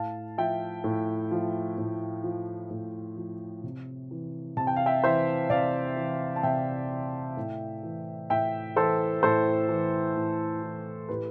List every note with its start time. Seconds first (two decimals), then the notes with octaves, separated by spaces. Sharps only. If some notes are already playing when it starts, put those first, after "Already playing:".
Already playing: A2 F5 A5
0.38 F3 E5 G5
0.84 A2
1.31 F3
1.78 A2
2.24 F3
2.71 A2
3.17 F3
3.64 C3
4.11 E3
4.57 C3 A5
4.67 G5
4.76 F5
4.86 E5 G5
5.04 E3 C5 E5
5.50 C3 D5 F5
5.97 E3
6.36 A5
6.43 C3 E5 G5
6.89 E3
7.37 A2
7.83 E3
8.30 A2 E5 G5
8.76 E3 A4 C5
9.23 A2 A4 C5
9.69 E3
10.16 A2
10.63 E3
11.09 A2 G4 B4